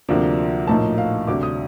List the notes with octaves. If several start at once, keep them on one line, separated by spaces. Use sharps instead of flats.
D2 C3 F3 A#3 D4
A#1 A2 F3 A#3 D#4 A5
F5
D2 C3 G3 D4 D6
D#6